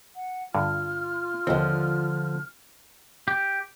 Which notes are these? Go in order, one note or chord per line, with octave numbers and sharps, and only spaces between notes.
F#5
G2 D3 F4 F6
D#2 D3 F3 C4
G4